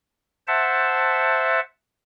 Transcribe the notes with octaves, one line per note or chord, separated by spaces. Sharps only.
C5 E5 F#5 A5